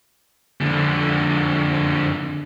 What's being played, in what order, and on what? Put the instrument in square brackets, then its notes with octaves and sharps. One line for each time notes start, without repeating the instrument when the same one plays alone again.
[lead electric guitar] F2 D3